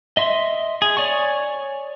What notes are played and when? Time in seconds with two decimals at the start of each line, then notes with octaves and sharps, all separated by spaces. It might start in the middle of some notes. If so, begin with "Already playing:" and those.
0.17 D#5 E5 C6
0.82 G#4
0.97 C#5 D5 G#5 C#6